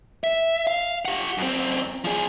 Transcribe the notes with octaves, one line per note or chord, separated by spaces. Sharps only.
E5
F5
G4 F#5
F#2 C4
F3 G#4